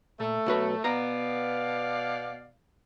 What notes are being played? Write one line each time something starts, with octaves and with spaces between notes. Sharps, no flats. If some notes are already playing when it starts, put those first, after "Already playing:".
A#2 A3
B1 F#4 B4
B2 B3 D5 F5 A#5